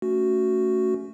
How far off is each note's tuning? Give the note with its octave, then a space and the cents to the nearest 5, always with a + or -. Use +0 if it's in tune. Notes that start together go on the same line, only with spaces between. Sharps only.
A3 +15 C#4 +15 F#4 +0